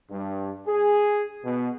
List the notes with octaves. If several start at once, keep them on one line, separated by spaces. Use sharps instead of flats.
G2
G#4
B2